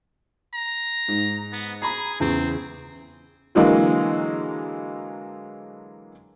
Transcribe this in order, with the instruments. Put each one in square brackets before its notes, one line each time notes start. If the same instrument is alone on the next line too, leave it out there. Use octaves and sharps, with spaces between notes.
[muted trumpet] A#5
[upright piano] G#2
[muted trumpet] B3
[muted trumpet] G#4 [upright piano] A#5 B5
[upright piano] E2 C#3 [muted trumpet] C4
[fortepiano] D3 E3 F#3 G#3 A#3